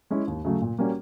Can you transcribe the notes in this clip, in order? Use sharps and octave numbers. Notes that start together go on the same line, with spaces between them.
G#3 C#4 E4
D#2
C#3 F#3 A3
A#2
G3 A#3 C#4 F#4